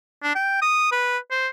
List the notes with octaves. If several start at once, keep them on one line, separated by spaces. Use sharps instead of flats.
D4
G5
D#6
B4
C5